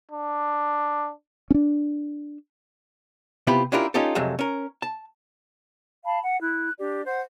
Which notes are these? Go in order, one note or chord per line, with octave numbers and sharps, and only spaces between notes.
D4
C#4 D4
C3 B3 E4 F4 G4 B5
C#4 D4 E4 F4 G4 A#4
C#4 D#4 F4 G4 A4
F2 C3 F#3 G#3 A3
C#4 A#4
A5
F5 A5 B5
F#5
E4 F#6
D4 G4 D5
C5 F#5